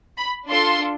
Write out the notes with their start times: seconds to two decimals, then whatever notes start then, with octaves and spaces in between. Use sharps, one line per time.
0.17 B5
0.49 D4 F4 A4 C6